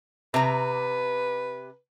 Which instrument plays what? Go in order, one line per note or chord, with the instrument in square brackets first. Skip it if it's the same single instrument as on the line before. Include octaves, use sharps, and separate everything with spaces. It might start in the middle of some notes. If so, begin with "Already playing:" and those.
[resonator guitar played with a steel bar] C3 A#5 [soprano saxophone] B4